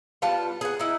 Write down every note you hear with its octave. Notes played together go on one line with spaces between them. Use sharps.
G3 B3 F4 A5
G#4 F#5
D#4 E4